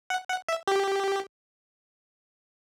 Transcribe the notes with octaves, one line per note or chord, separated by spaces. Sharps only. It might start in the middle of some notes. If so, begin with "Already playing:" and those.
F#5
F#5
E5
G4